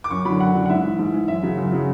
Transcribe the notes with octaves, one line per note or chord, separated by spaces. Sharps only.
D6
F#2 C#6
D3 F#3 B5
F#2 F#5
D3 F#3
F#5
G#2 E5
E3
G#2
E3
F#2 E5
C#3 F#3
F#2
C#3 F#3